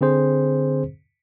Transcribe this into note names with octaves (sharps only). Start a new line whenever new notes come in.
D3 C4 G#4 C5